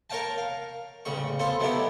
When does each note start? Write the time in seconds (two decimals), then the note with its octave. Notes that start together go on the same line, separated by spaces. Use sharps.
0.10 A#4 C#5 F5 G5 A5
0.38 F5
1.05 A1 C#3 G3 C#6
1.39 B3 F4 A4 C5
1.60 D#3 F#3 A3 B3 E4 G4